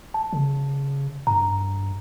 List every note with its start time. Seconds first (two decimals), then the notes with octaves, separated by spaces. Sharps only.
0.14 A5
0.33 C#3
1.27 G2 A#5